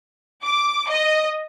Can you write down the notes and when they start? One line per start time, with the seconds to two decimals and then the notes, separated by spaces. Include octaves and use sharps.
0.44 D6
0.92 D#5